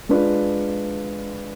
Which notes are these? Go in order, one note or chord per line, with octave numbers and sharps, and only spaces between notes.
G#3 D4 F4 B4 D5